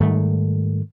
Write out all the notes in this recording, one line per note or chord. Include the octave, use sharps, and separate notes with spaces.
G#2 D#3 G3 A3